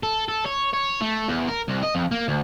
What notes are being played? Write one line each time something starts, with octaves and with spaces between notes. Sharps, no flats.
A4
A4
C#5
C#5
A3
E2
A#4
C2
D#5
F2
A#3
D2